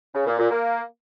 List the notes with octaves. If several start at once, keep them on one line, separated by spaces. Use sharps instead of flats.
C#3
A#2
A#2
A#3